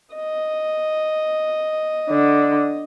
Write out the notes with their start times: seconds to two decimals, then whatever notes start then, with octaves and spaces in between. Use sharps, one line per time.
0.15 D#5
2.10 D3